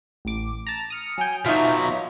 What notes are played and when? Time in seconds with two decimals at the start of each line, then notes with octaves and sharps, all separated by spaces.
0.25 A1 D6
0.67 A5 A#5
0.90 D#6 F6 C#7
1.18 F#3 G5 G#5
1.46 B2 F#3 D#4 F4 E5